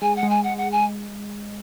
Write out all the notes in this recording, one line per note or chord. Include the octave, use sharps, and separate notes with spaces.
G#3 G#5
F#5
G#3
G#5
F#5
F#5
G#5